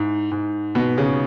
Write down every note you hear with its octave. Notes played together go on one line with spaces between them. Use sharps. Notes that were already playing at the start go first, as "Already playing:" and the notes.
Already playing: G#2 E4
G#2
B2 B3
C#3